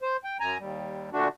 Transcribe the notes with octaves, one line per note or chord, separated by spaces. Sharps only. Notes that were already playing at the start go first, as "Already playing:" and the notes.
C5
G5
F#2 G#5 A#5
D#2 G3
A#2 D3 A3 D4 F#4